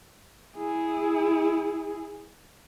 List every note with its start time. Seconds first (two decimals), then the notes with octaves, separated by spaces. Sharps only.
0.57 E4 G#4